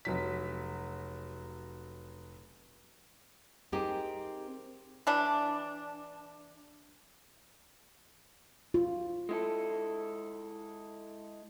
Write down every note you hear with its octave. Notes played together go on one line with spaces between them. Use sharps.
F1 F#3 B6
C4 D#4 G4 G#4 A#4
E3 D4
F4
G#3 E4 A4